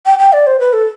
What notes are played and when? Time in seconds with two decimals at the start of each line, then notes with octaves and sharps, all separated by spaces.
0.06 G5
0.19 G5
0.33 D5
0.47 C5
0.60 B4
0.73 A4